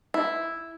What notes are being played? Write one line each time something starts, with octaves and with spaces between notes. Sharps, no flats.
E4